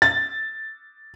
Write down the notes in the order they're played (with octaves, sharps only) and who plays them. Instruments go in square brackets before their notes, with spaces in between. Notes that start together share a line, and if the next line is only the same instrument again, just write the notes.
[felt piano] A6